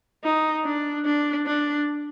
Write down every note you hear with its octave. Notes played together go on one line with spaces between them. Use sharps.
D#4
D4
D4
D4